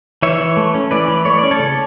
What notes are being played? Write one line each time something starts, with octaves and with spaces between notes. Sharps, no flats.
E3 C#5 E5
E3
A3
C#4
E3 B4 D5
E3
A3 C#5
C#4 D5
A4 C#5
C#3